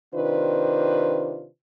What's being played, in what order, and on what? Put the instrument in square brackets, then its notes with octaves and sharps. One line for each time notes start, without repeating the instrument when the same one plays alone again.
[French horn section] C3 D#3 D4 F4 B4 C5